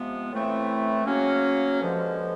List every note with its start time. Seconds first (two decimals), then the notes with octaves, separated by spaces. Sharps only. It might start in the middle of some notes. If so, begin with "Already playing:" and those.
Already playing: C3 F3 G#3 B3
0.31 A2 E3 A3 C4 E4
1.05 C#3 F#3 A#3 C#4
1.79 G2 D3 F3 G#3